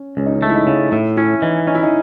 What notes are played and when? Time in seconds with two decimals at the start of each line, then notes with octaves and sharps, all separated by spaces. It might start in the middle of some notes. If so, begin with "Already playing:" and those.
Already playing: C#4
0.17 C#2 C#4
0.26 D#4
0.35 C#4
0.42 A3
0.49 E4
0.55 D#4
0.67 C#3
0.92 A2 E4
1.17 C#4 E4
1.42 E3 D#4
1.67 C#4 D#4
1.75 E4
1.83 D#4